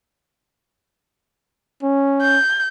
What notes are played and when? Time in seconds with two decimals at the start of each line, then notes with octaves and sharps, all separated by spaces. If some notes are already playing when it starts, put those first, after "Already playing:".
1.83 C#4
2.22 G6